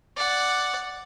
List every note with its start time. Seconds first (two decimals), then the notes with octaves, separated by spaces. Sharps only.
0.17 D5 F#5